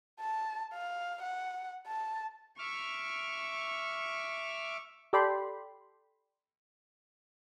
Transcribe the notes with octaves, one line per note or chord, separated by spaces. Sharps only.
A5
F5
F#5
A5
E5 C#6 D6 F6
G4 A4 D5 G5 B5 C6